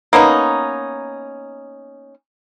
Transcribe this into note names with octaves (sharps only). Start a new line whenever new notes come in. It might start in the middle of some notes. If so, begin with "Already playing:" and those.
A#3 B3 C#4 D#4